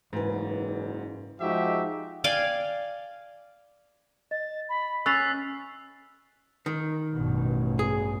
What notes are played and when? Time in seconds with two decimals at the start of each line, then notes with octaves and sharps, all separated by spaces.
0.13 F#1 G#2 E3 B4
1.40 F3 G#3 D#4 F#4 G4 E5
2.24 D5 F5 G5 G#5
4.31 D#5 A6
4.69 B5
5.06 C#4 E6 F#6 A6 B6 C7 F7
6.66 D#3
7.13 A1 G2 B2
7.79 G#4